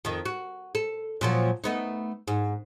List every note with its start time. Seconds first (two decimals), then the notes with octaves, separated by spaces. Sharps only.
0.05 F2 D#3
0.25 F#4
0.75 A4
1.21 A#2 F3 F#3
1.64 A3 B3 D#4
2.28 G#2